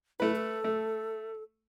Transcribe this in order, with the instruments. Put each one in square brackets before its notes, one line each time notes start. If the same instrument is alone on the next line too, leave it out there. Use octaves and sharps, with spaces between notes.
[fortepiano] A3 B4 [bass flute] E4
[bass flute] A4
[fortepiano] A3